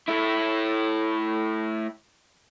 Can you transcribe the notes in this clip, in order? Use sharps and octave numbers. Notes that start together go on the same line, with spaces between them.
A3 E4